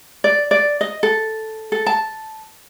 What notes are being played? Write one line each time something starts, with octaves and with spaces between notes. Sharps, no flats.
D5
D5
D#5
A4
A4
A5